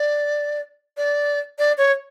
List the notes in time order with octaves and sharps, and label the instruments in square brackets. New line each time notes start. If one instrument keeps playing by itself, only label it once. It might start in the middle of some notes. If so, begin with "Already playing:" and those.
Already playing: [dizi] D5
D5
D5
C#5